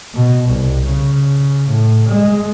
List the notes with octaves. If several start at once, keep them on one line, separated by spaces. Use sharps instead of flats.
B2
C2
C#3
A2
G#3